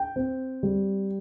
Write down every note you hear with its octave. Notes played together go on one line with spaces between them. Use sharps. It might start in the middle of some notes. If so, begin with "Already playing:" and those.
Already playing: G5
C4
G3